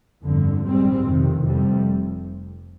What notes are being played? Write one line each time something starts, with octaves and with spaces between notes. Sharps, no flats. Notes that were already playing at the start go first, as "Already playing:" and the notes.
G1 F2 D3
A#1 G#2 G3 C4
F2 C3 D#3
F1 F2 C3 G3